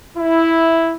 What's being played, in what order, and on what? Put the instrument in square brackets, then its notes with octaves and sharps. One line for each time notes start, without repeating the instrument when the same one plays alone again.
[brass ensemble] E4